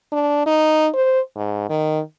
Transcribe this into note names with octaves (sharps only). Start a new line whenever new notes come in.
D4
D#4
C5
G#2
D#3